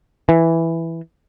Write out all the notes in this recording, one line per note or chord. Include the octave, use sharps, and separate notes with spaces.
E3